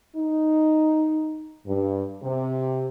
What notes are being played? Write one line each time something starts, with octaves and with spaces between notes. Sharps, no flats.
D#4
G2
C3